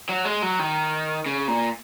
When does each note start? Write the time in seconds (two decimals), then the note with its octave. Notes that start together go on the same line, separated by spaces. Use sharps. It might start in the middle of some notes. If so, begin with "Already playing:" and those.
0.09 F#3
0.25 G#3
0.42 F#3
0.59 D#3
1.26 C#3
1.48 A#2